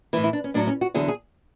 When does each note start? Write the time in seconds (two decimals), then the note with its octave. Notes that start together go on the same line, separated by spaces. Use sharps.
0.13 E3 E4
0.17 A2
0.24 E4
0.33 D4
0.44 C#4
0.54 A2 F#3 D4
0.67 C#4
0.81 F#4
0.94 E2 D3 F#3 G#4
1.08 G#4